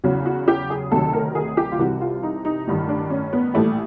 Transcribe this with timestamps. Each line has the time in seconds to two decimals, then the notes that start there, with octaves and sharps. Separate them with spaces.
0.04 E2 C#3 F#3 F#4
0.26 F#4
0.48 G4
0.70 G#4
0.92 D2 C3 D#3 F#3 A4
1.13 A#4
1.35 G#4
1.57 G4
1.72 F4
1.79 C2 C3 E3 G3 F#4
2.01 F4
2.23 D#4
2.45 D#4
2.67 A1 G2 D#3
2.89 D4
3.10 C#4
3.33 B3
3.54 A#1 A2 E3 G3 A3